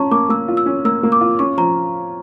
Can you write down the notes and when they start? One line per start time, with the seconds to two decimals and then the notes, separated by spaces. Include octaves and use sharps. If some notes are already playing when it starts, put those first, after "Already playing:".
Already playing: C#4 F4 A5 A#5 C#6
0.11 A#3 D6
0.29 A#3 E6
0.48 F4
0.57 E6
0.66 C#4
0.85 A#3 E6
1.03 A#3
1.12 D6
1.21 F4
1.39 C#4 C#6
1.57 F3 A#5